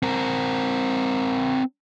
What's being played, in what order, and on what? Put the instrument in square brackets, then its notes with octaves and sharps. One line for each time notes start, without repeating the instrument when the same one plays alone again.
[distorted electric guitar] C4 A#4